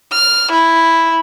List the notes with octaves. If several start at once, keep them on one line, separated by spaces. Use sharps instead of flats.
F6
E4